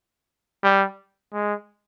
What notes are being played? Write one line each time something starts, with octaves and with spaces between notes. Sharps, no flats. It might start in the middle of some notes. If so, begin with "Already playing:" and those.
G3
G#3